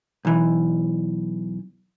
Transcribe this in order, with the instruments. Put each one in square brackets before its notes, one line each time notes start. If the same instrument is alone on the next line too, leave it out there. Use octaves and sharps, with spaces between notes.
[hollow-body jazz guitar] B1 E3